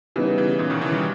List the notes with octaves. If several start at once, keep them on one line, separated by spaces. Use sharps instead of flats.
C#3 E3 G3 B3 D#4
C#3 E3
A#2 C#3
B2 D#3
C#3 E3
D#3 G3